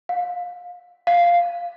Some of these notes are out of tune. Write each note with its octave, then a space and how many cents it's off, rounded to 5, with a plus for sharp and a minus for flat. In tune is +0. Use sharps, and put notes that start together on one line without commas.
F5 +30
F5 -5